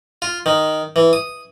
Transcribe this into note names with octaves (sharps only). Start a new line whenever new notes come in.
F4
D#3
E3
D#6